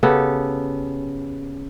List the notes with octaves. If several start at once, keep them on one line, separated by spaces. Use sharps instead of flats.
C#3 B3 G4 A4